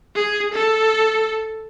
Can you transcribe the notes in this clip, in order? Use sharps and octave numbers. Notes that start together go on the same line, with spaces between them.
G#4
A4